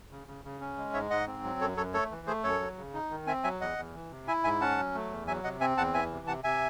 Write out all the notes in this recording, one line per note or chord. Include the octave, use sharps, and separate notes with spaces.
C#3
C#3
C#3
C#4
G#3
G#2 C#5 E5
G#2 D#5 F#5
C4
F#3
F#2 A4 C#5
F#2 A4 C#5
A3 A4 C#5
E3
A3 G#4 C5
F#2 A4 C#5
F#3
C#3
D#4
D#3
C4 E5 G#5
F#3 E5 G#5
E2 D#5 F#5
E2
E3
C3
E4 E5 G#5
G#2 E5 G#5
C#4 F#5 A5
F#3
A3
E2
F#3 E5 G#5
C3 D#5 F#5
C4 E5 G#5
E2 F#5 A5
E3 E5 G#5
C3
C3 F#5 A5
C3 E5 G#5